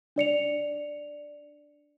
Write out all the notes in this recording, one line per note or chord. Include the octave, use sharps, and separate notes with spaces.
D4 D5 C#7 F7